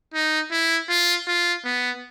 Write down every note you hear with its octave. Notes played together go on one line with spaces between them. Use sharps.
D#4
E4
F4
F4
B3